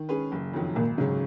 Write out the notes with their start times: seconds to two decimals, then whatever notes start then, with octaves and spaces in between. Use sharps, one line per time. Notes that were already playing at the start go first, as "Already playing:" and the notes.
Already playing: D#3
0.09 G#3 C#4 G#4 B4
0.32 F#1
0.54 F2 D#3 F#3
0.75 G#1 A#2
0.98 G#2 C#3 F#3 C#4